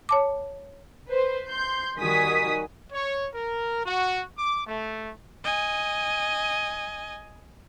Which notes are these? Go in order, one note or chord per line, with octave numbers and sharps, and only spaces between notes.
C#5 A5 D6
B4 C5
C6 G6
D#3 G3 F#4 G#5 D#6 B6
C#5
A#4
F#4
D6
A3
D#5 G#5